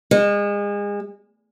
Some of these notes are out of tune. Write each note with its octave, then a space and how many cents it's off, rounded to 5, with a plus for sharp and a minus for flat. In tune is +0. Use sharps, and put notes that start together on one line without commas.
G#3 -30